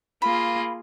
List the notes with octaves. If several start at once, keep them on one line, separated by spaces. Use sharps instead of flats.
A#3 F4 G#4 B5